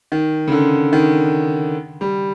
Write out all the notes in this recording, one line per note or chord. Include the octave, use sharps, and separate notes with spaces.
D#3
C#3
D3
D#3
G3